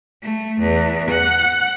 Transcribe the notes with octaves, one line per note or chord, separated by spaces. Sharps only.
A3
E2
F#5